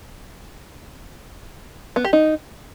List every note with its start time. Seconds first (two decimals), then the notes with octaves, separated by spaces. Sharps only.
1.96 B3
2.04 G4
2.13 D#4